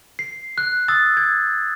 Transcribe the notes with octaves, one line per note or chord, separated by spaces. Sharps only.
C7
F#6
D#6 E6 A6
G#6